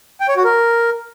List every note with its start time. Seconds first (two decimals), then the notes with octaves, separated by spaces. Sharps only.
0.21 G5
0.29 C#5
0.36 F#4
0.44 A#4